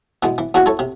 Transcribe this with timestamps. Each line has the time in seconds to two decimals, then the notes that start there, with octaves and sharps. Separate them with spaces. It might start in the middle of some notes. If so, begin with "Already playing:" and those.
0.23 B2 E3 G#3
0.38 E3
0.54 E2 E3 F#4 F#5 G#5
0.66 E4 A4 C#5
0.79 C3